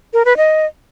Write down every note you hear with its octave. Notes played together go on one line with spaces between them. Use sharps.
A#4
B4
D#5